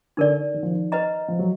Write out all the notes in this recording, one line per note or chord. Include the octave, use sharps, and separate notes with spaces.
D3 D#4 A#4 D5
D#3
F3
D#3
B4 D#5 A#5
F3
F#3